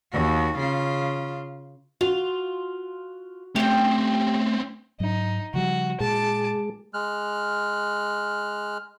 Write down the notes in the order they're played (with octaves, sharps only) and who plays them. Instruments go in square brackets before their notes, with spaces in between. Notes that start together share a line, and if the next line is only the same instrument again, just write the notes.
[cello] D#2 F#4
C#3 F4
[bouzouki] F4 [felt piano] F#4
[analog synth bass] A3 [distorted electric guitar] C4 C#4 [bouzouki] G4 G5
[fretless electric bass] G#2 F#3 [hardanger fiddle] D#4
[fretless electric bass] C#3 F3 G3 [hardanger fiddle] F#4
[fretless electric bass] A#2 [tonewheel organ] G#3 G#4 [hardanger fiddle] A5 D6
[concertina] G#3 F6 F#6